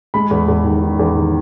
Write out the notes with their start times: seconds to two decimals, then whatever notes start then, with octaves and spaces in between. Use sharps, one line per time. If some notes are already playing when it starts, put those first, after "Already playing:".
0.14 G#3 B5
0.31 E2
0.48 E2
0.64 D#3
0.82 D#3
0.99 E2
1.15 D#3